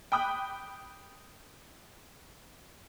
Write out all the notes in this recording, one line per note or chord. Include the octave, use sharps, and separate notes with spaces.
G5 B5 D6 D#6 F#6